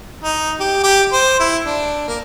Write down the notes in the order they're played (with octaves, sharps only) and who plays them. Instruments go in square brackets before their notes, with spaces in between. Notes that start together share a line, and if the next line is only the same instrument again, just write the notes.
[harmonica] D#4
G4
G4
C5
E4
D4
A#3